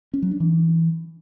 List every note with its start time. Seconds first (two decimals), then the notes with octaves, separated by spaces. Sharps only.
0.14 C#4
0.22 F#3
0.31 D4
0.40 E3